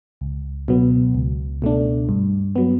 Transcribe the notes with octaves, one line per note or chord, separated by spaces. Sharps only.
C#2
B2 F#3 B3
C#2
B2 A3 D4
G2
F#3 B3